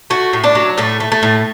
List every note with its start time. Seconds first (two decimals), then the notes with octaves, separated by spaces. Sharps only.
0.10 A3 F#4
0.33 A2
0.44 D4
0.55 F#3
0.78 A2 A3
1.00 A3
1.12 A3
1.23 A2